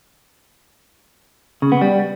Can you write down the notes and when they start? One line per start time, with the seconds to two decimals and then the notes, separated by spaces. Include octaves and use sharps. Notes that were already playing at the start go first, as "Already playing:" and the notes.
1.62 C#3
1.72 B3
1.81 G3